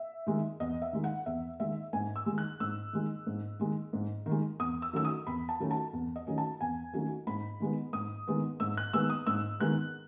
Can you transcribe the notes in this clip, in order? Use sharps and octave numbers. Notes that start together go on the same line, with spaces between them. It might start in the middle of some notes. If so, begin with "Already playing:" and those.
Already playing: E5
D#3 G#3
E2 D#5
E5
D#3 G#3
F#5
E2 E5
D#3 G#3 E5
G#2 G#5
E6
D#3 G#3
F#6
G#2 E6
D#3 G#3
G#2
D#3 G#3
G#2
D#3
G#3
E2 D#6
E6
D#3 F#3 A3 C#4 E6
D#6
E2 B5
A5
D#3 F#3 A3 C#4
A5
E2
D#5
D#3 F#3 A3 C#4
A5
E2 G#5
D#3 F#3 A3 C#4
G#2 B5
D#3 G#3 B3
G#2 D#6
D#3 G#3 B3
G#2 E6
F#6
D#3 G#3 B3 E6
D#6
G#2 E6
D#3 G#3 B3 F#6